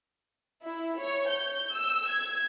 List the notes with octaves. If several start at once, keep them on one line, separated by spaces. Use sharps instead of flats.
E4
C#5
G6
E6
G#6